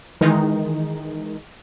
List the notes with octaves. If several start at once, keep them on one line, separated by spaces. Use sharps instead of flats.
D#3 E3 G#3 D#4